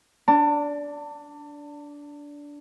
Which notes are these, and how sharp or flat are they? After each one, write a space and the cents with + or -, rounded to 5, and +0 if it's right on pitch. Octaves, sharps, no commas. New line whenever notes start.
D4 -15 A5 +30